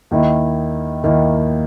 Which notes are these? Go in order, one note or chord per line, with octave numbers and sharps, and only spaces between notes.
D#2 D#3 A#3 E4
D#2 D#3 A#3 E4